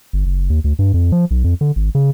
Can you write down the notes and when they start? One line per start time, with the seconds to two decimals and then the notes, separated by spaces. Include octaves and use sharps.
0.13 G1
0.26 F#1
0.50 D#2
0.64 D2
0.79 G2
0.94 F2
1.12 F3
1.31 B1
1.44 F2
1.61 D3
1.76 G#1
1.95 C#3